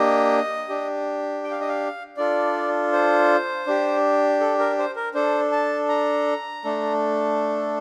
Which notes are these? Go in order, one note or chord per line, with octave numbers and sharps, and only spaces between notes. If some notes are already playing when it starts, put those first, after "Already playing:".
Already playing: A#3 D4 G4 D#5
D4 G4
G5
F5
D#5
F5
D4 F4 A4 D5
C5
D4 G4
A4
A#4
C5
A#4
D4 A4 C5
A5
A#5
A3 D4 A4